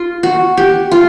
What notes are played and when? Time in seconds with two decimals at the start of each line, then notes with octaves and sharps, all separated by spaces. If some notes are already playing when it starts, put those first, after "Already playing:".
Already playing: F4
0.23 F#4
0.57 G4
0.91 F4